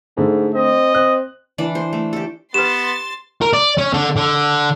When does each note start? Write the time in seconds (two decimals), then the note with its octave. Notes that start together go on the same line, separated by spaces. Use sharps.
0.17 G#2 D3 A3
0.54 C4 D#5
0.94 C4 F#6
1.58 E3 D4 D5
1.75 C5
1.93 A3
2.13 G4 A4
2.54 B3 G4 B4 C6 A6 E7
3.42 A#4
3.53 D5
3.78 C#4
3.94 D3
4.17 D3